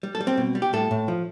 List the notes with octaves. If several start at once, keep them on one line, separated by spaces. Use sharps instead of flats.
G3
A4
G3
C4
B2
G3
G4
A2 A4
A2
F3